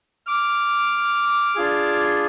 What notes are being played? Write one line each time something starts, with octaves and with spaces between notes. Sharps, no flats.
D6 F6
D4 F4 G#4